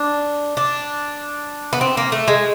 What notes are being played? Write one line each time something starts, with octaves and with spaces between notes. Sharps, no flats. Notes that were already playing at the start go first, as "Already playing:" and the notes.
Already playing: D4
D4
B3
C4
A#3
A3
G#3